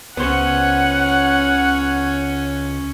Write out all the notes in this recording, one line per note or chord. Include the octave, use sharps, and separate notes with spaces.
C#2 B3 C#4 C5 C#5 F#5